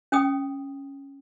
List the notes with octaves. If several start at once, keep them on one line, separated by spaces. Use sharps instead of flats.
C#4 G5 D#6